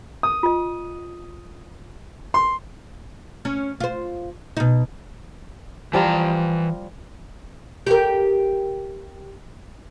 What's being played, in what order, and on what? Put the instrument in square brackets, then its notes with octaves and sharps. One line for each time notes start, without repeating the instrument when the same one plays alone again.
[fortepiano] D#6
[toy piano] F4 D#5
[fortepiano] C6
[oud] C#4
F4 C5
B2 D#4
[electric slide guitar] E3 A#5 [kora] F3 G3 F4
[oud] G4 A#4